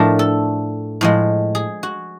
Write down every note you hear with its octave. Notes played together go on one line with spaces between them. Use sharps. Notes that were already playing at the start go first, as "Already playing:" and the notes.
Already playing: A2 F3 A3 D4 A#4
A4
A2 F3 G#3
G#4
F#4